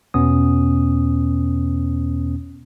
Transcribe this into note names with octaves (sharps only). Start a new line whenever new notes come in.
E2 B2 B3 C#4 D#6